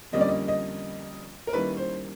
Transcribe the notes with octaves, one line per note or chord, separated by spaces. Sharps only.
F2 D3 G3 A#3 C#4 D#5
D5
D#5
D#5
A#4
D#3 G3 A#3 C#4 E4 B4
C5